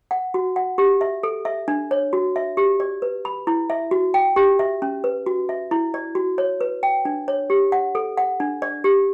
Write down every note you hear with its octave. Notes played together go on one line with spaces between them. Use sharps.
F#5
F#4
F#5
G4
E5
A4
E5
D4
C#5
F#4
E5
G4
D5
B4
B5
E4
E5
F#4
G5
G4
E5
C#4
B4
F#4
E5
E4
D5
F#4
C#5
B4
G5
D4
C#5
G4
F#5
A4
F#5
D4
D5
G4